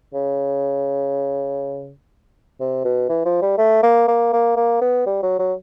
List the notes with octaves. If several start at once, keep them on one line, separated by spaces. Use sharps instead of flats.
C#3
C3
B2
E3
F3
G3
A3
A#3
A#3
A#3
A#3
B3
G3
F#3
F#3